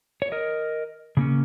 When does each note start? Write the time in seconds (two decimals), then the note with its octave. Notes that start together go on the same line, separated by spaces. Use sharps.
0.22 C#5
0.32 A#4 D#5
1.17 C#3 A#3 C#4